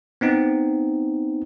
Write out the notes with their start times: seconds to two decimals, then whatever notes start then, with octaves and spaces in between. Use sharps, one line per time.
0.21 B3 C4 D#4